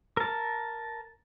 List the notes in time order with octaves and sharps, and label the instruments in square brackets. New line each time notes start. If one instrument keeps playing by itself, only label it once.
[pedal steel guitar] A#4 A5